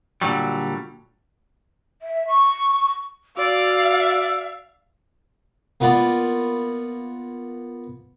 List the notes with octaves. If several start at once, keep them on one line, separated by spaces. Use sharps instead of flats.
A#2 D3 F#3 G3
E5
C#6
F#4 D5 F5 E6
A#3 B3 F4 B4 D5